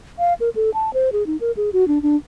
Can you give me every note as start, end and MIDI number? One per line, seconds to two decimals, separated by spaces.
0.19 0.34 77
0.40 0.49 70
0.56 0.70 69
0.74 0.93 81
0.94 1.10 72
1.12 1.26 68
1.27 1.37 63
1.41 1.52 70
1.57 1.70 68
1.73 1.87 66
1.88 2.01 62
2.03 2.16 62